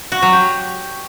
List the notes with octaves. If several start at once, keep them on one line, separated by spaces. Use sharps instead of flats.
F#4
F#3
G4